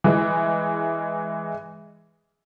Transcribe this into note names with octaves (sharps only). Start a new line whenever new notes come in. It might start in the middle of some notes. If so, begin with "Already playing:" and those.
E3 G#3